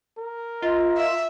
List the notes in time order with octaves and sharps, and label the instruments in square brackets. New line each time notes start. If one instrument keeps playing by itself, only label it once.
[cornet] A#4
[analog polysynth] F4 [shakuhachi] D#5
[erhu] E5